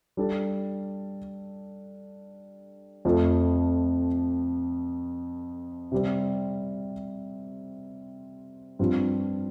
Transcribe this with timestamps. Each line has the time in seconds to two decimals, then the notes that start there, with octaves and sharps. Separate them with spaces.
0.17 G3 D4 A4
3.05 F2 F3 A3
5.92 C3 G3 C4
8.79 G2 F3 C4 F4